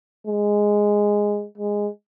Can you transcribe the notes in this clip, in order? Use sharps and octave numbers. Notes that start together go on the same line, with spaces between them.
G#3
G#3